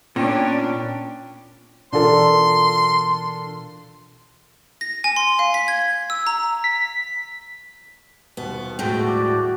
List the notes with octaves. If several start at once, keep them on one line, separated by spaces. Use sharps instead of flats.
A#2 B3 C#4 D4 G5
B2 E3 D4 F4 A4 A#4 C6
A#6
G#5
C6
F5
B6
G#6
E6
A#5
B6
D#1 B2 B3
A2 G#3 A3 F#4 G5
D5